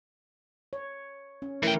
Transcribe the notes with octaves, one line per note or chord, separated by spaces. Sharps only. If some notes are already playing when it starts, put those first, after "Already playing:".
C#5
C#4
E3 A3 E4 A#4 G5